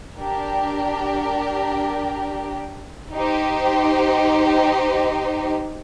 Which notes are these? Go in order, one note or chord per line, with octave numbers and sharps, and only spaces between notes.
D4 G4 A#4
D#4 G4 C5